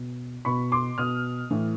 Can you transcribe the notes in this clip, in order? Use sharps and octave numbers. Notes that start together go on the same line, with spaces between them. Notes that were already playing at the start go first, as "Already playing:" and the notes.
Already playing: B2
B2 B5 C#6
C6 D6
B2 D#6 F6
A2 E3